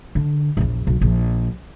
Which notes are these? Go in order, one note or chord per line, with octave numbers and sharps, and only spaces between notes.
D3
A#1 E2
B1
A#1